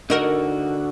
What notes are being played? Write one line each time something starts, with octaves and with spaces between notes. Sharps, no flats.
D3 D#4 F#4 A#4